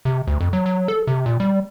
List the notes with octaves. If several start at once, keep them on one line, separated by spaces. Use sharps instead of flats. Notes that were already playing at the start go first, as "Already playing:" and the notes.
C3
D2
F2
F#3
F#3
A4
C3
A#2
G3